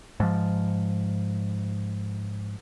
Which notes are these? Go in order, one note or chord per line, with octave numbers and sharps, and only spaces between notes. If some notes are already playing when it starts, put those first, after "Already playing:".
G#2 F3